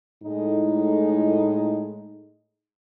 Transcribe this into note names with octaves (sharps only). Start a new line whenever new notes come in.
A2 G#3 D#4